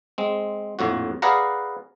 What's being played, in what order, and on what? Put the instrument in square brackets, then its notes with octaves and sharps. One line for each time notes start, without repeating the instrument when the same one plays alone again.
[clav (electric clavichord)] G#3 C4
A#1 F2 A2 F#4
G#4 B4 D5 F5 F#5 A#5